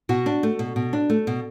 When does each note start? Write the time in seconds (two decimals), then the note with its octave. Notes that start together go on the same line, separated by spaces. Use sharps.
0.09 B2 F#4
0.26 D4
0.43 A3
0.59 B2
0.76 B2
0.93 D4
1.10 A3
1.27 B2